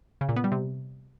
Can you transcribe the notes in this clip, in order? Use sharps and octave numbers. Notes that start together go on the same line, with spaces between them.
C#3
A#2
B3
G3
C3